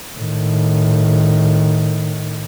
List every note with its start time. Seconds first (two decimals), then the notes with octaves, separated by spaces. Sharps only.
0.17 A2 D#3